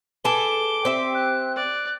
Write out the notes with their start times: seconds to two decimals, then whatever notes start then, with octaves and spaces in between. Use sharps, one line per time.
0.25 G#4 A4 B4 D6 G7
0.85 C4 G4 E5
1.15 F#6
1.55 D5 F#6